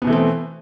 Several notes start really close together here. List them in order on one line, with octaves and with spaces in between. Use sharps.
B3 B2 E3 A3 C4